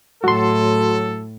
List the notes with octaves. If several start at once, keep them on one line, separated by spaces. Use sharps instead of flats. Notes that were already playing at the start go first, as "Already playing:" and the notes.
A2 F#3 F#4 A4 C6